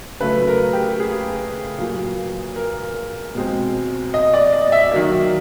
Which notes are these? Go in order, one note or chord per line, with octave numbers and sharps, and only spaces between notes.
C#3 F#3 A3 B4
A#4
G4
G#4
A#2 F#3 A#3
A#4
B2 G#3 C4
D#5
D5
D#5
E5
D#3 F#3 A#3